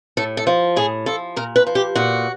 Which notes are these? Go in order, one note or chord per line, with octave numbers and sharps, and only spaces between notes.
A2 A4
A4
F3
A2 G#4
F3 A4
A#2 A#4
B4
F3
G4
A#2 F#4